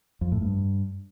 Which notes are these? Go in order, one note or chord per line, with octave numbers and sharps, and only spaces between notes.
F2
A2
G2